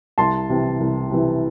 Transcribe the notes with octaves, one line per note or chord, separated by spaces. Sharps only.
C2 A5 C6
C3 E3
C2
C3 E3